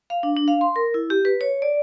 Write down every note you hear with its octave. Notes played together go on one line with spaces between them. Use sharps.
F5
D4
D4
F5
C6
A#4
E4
G4
B4
C#5
D5